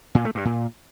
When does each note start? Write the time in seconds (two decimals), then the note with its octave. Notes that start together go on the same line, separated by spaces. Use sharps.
0.15 A#2
0.25 A3
0.35 G2
0.45 A#2